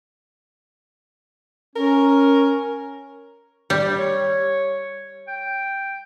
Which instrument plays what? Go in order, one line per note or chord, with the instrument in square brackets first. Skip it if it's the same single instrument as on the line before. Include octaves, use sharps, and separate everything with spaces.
[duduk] C#4 [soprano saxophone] A#4
[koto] G3
[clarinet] C#5
G5